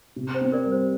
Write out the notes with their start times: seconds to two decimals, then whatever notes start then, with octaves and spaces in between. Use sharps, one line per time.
0.16 C3
0.34 C5
0.41 C4
0.52 A#4 D5
0.65 G3
0.72 C5